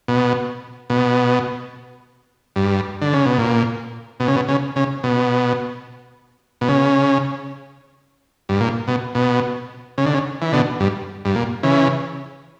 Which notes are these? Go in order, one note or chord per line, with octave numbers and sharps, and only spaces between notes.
B2
B2
G2
D3
C#3
B2
A#2
B2
C#3
B2
C#3
C#3
B2
B2
C#3
G2
A#2
B2
B2
C#3
D3
C#3
E3
B2 D3
G2
G2
A#2
C#3 E3